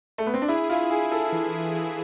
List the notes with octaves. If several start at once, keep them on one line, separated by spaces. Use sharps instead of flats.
A3
B3
C4
D4
E4 G#4
E4 F4
E4 G#4
G#4 A4
E3
G#4
E3